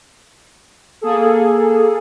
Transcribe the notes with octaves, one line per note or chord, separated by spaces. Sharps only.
A#3 G#4 A4